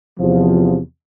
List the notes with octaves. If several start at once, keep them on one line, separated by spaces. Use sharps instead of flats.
E2 C3 F3